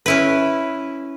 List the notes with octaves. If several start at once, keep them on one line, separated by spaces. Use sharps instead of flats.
C#4 E4 B4